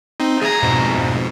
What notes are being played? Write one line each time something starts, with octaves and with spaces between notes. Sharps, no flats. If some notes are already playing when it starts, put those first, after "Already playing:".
C4 D#4
D2 G#4 A#5 G#6
F2 G#2 B2